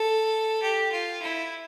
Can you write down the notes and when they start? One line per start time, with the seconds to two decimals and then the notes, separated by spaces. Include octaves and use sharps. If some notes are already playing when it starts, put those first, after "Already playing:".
Already playing: A4
0.62 G4
0.92 F4
1.22 E4